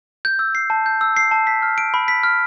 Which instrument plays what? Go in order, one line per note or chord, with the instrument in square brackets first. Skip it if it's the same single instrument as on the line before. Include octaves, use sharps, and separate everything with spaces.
[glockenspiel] G6
E6
C7
A5
G6
E6
C7
A5
B6
F6
D7
B5
B6
F6